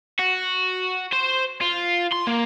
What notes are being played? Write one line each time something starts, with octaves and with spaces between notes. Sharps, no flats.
F#4
C5
F4
C6
A#3